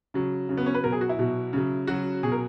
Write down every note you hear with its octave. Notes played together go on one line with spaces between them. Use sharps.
C#3 F#3
C#3 F#3
B3
C#4
B4
B2 F#3 A#4
G#4
F#4
E4
B2 F#3
C#3 F#3
C#3 F#3 F#4
B2 F#3 G#4
A#4